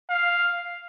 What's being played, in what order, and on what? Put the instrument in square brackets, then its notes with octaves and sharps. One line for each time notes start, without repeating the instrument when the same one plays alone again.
[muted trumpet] F5